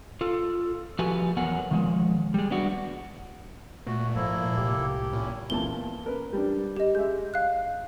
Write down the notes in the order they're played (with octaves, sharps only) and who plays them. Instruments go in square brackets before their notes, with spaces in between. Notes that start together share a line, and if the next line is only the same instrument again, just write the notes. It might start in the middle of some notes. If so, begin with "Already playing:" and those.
[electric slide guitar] F4 A4
F3 F#4 G4 A4 B4 G#5
E2 F#3 B3 A#4 F#5 G#5
D#3 F3 G#3
G3 G#3
B3 D4 F#4
[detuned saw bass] A#2 [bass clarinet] A3 [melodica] F#4
[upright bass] G#2 [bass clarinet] F3 [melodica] A#3 E4 A4
[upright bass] C2 A2 [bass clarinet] G4
[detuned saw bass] A#2 [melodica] C#4 E4
[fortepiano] E2 A#2 A5 [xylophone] G7
[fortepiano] A#4 B4
G3 D4
[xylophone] G4 D#5
[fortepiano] G#3 E5 [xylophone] G6
[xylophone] F5 F#6